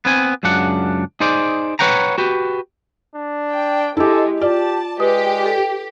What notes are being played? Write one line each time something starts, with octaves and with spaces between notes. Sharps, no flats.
B3 C4 G#5
C#2 F#2 C#3 D4 F#5
D#4 G#4 C5 D5
B4 C#5 F#5 G5 A#5
F#4 G4 B4
D4
G5
G#3 E4 G4 A4
F4 G4 D5 A5
G#3 G4 B4 D#6
A4